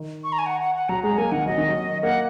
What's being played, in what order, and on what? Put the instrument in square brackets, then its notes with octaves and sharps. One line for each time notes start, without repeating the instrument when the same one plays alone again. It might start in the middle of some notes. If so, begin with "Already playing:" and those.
Already playing: [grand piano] D#3
[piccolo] C#6
A#5
G#5
F#5
F#5
F#5
[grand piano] F#3 [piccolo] A#5
[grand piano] G#3 [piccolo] A#5
[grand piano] A#3 [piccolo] G#5
[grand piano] D#3 [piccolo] F#5
[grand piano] F#3 [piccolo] D#5
[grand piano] D#3
F#3
[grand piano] A#3 [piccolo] F#5